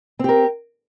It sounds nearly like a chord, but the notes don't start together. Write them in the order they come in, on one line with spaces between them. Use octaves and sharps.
C4 G4 A#4